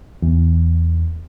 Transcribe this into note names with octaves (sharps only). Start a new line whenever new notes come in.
E2